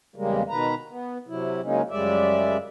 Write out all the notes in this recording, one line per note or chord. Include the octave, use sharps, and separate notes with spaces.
E2 C#3 G3 G#3 A#3
B2 D#3 B4 A#5
B3
C3 F#3 E4
C#3 F#3 G#3 A#3 C#4 D#4
F#2 C#3 G3 G#3 D5 E5